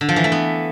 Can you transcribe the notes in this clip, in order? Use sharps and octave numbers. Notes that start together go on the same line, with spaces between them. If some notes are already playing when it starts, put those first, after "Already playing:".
D3
F3
E3
A3
B3